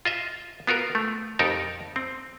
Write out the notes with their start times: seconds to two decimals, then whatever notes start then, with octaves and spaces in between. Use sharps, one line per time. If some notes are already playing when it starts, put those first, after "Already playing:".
0.05 F4 D#5 E5
0.67 B3 F4 F#4 A#4
0.95 A3
1.39 F2 D#4 G4 A4 A#4
1.96 C4